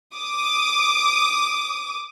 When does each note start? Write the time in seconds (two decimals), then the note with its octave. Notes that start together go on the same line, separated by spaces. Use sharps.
0.16 D6 D#6